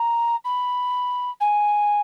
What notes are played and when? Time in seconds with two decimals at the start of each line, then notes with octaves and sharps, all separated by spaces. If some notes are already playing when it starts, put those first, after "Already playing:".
Already playing: A#5
0.45 B5
1.40 G#5